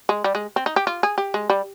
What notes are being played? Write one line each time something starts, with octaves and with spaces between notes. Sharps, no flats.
G#3
G3
G#3
C4
D#4
G4
F4
G#4
G4
G#3
G3